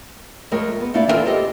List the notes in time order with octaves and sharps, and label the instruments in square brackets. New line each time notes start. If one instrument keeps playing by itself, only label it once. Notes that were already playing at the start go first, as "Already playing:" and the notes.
[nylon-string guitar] F2 G#3 A3 A#4 C#5 G5
B3
A3 A#3 D4 E4 D5 F5
E3 G3 C4 F4 A4 A#4
G4 A4 C5 D#5 G5